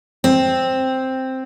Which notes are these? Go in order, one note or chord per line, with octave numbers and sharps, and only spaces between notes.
C4